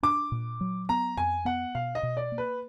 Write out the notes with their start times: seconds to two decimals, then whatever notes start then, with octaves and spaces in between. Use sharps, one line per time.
0.03 D4 D6
0.32 A#2
0.61 F#3
0.89 B3 A#5
1.17 F2 G#5
1.45 B3 F#5
1.75 B2 F5
1.95 D#5
2.03 B2
2.17 D5
2.32 A#3
2.38 B4